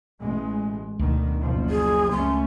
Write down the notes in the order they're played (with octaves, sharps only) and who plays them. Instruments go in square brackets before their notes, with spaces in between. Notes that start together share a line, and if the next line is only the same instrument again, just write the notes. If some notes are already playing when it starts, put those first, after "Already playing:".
[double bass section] A1 G#3
[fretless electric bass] D2 [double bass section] B2 D3 D#3
[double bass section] F#1 F3
[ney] G#4
[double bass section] C#2 A3 C#4 [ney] C6